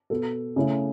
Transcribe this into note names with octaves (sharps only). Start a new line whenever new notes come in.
B2 B3 A4
C#3 A3 E4